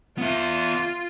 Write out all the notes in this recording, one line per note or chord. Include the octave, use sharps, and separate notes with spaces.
B3 F4 E5